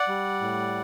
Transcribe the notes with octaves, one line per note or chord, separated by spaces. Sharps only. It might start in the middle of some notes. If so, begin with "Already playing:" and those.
Already playing: D5 F#5
G3
A2